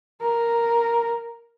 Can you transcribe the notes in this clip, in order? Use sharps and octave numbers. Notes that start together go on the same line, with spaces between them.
A#4